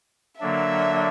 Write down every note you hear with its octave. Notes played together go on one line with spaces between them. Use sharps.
D3 F#3 A#3 D4 E5